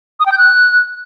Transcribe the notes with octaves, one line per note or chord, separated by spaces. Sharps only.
D#6
G5
G6
F#6